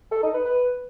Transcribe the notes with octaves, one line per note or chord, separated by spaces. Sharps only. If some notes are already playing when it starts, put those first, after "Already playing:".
A4
D#4
B4
B4